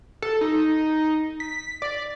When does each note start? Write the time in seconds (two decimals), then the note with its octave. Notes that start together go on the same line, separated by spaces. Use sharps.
0.22 A4
0.41 D#4
1.40 B6
1.82 D5